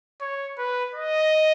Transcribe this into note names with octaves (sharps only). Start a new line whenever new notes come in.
C#5
B4
D#5